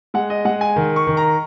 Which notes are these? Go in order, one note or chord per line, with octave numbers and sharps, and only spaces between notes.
G#3 F#5
D#5
G#3 F#5
G#5
D#3
C#6
D#3
A#5